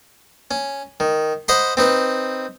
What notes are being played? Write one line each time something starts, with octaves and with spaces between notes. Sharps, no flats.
C#4
D#3
C5 D#5 F#5 B5 C6
C4 D#4 B4